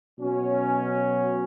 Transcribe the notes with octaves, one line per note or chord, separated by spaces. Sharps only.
B2 F#3 C#4